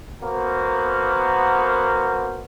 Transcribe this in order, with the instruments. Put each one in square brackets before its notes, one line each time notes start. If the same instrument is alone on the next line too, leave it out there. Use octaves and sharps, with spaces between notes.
[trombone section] A#3 B3 F#4 A#4 C5